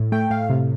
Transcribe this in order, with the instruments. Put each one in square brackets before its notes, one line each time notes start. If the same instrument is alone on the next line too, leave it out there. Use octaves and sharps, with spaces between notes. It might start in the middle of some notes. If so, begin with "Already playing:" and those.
Already playing: [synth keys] A2
A3 G5
A2 F5
C3